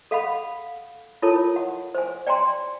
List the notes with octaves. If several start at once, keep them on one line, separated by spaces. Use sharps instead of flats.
A4 F5 F#5 B5
E4 F4 A4 A#4 C#5 A5
F#5
C5 G#5
D5 G5 G#5 A#5 C6